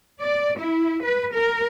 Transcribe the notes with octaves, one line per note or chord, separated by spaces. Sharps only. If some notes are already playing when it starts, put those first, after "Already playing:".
D5
E4
B4
A#4